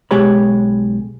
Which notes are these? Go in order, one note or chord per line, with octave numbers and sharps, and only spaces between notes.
B1 G#3 G4 C#5 B5